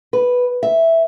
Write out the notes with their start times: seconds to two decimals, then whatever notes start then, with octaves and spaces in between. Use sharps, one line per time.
0.13 B4
0.63 E5